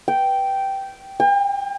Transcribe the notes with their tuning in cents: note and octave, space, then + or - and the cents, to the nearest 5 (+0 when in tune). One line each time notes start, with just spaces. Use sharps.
G5 -10
G5 +40